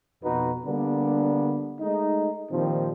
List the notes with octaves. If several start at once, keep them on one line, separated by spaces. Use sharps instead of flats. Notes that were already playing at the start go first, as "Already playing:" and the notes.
F2 B2 D#4 F#4 B4
D3 G3 A#3 B3 D4
G#3 A3 D#4
A#2 D#3 F3 G3 C4